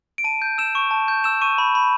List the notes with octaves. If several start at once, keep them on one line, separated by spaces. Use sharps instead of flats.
D7
A5 D#7
G6
E6 E7
C#6
A5
G6
E6 E7
C#6 D#7
B5
B5